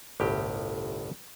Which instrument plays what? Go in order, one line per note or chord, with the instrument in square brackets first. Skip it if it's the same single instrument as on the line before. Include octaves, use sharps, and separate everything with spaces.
[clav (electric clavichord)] G1 C2 A2 G4